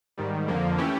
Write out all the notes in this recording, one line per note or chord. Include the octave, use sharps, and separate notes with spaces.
G#2 D#3 G3
F2 D3 F3 A#3
E3 A3 C#4 E4 G4